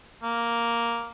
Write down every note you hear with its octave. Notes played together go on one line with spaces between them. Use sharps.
A#3